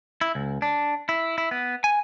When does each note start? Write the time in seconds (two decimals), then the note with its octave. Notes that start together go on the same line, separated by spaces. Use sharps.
0.21 E4
0.35 C#2
0.62 D4
1.09 E4
1.38 E4
1.51 B3
1.84 G#5